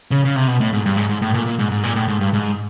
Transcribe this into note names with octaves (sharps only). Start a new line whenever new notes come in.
C#3
C#3
C3
B2
A2
G#2
G2
G#2
G#2
A2
A#2
A#2
G#2
G#2
A#2
A2
G#2
G2
G#2